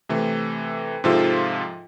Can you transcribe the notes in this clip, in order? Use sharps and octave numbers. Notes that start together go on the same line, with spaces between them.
C3 E3 A3
G#2 C3 F3 F4 A4 E5